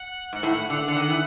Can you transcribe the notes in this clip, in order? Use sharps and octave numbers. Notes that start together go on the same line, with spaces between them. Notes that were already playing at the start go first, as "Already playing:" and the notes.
Already playing: F#5
G#2
A2
D3
D3
D#3
E3